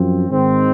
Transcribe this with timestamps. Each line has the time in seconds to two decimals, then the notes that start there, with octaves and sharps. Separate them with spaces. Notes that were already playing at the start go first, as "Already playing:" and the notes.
Already playing: F#2 F3 C4
0.29 G#1 G#2 D#3 G#3 C4